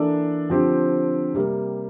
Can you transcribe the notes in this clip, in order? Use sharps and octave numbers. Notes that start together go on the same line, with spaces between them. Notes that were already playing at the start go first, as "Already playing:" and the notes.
Already playing: E3 A#3 D4 A4 D5
D3 F3 C4 G4
C3 G3 A#3